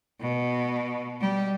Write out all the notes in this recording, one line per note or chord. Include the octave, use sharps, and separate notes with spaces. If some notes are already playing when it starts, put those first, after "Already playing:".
B2
G3